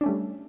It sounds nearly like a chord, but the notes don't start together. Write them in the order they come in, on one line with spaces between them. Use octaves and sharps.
D4 C#4 A3 G3